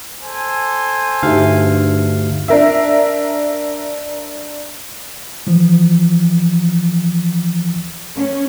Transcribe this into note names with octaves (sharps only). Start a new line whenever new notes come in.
A4 C5 G#5
D2 G2 D#4 G4 E5 F5
D4 A#4 E5
E3 F3
C#4